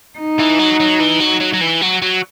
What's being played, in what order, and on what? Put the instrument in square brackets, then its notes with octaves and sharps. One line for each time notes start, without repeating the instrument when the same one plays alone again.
[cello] D#4
[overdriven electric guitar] E3
F#3
F#3
E3
F#3
F#3
F#3
E3
F#3
F#3